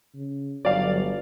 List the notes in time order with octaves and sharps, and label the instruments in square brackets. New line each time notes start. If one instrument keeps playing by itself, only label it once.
[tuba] C#3
[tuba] G1 [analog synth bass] F#3 [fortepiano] D5 F5